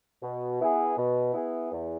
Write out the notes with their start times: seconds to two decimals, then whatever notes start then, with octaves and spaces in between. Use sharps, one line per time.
0.23 B2
0.59 B3 E4 G#4
0.97 B2
1.34 B3 E4 G#4
1.72 E2